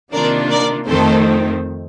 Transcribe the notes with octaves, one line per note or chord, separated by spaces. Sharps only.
C3 D#3 A#3 D4 F4 A#4 D5
A#4 D5
F2 D#3 A3 C4 A4 C5